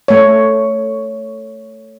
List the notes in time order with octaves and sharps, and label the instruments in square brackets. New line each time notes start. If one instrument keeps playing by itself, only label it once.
[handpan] A3 C#5